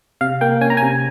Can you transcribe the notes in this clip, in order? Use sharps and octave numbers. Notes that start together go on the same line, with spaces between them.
C3 F5
A#3 G5
C#4 G#5
A#5
C3 G#5